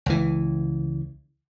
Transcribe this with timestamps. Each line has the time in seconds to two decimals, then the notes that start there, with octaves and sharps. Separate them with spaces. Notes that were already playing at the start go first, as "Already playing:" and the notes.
0.06 C#2 E3